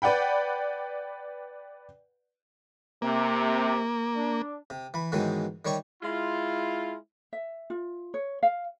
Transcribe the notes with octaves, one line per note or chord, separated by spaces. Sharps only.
B4 D5 F#5 G5 B5
C3 A#3
D4
C3
E3 B5
G#2 B2 D#3 E3 F#3 G#3
D#3 G3 C#5 C#6
G#3 E4 F4
E5
F4
C#5
F5